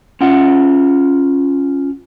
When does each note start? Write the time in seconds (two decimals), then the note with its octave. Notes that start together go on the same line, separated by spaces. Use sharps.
0.21 C#4 F4 F#5